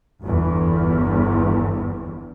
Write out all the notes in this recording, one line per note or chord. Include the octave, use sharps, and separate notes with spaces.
G1 E2